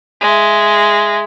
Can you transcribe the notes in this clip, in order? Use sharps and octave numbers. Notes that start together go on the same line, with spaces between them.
G#3 E5